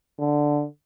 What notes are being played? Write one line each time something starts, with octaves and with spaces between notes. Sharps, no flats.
D3